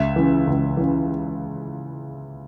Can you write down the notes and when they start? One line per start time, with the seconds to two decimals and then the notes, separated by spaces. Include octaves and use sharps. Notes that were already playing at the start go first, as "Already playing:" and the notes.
Already playing: C#2 E5
0.16 C#3 E3
0.47 C#2
0.77 C#3 E3